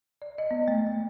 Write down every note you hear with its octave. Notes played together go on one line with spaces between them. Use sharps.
D5
D#5
B3
A3
A3